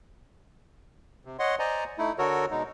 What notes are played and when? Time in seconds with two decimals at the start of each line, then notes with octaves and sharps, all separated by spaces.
1.25 C3
1.39 C#5 D#5 F#5 C6
1.59 C5 D5 D#5 G#5 A#5
1.98 A3 D#4 E4
2.18 D3 F#4 A4 A#4 C#5
2.51 B2 G#3 D#4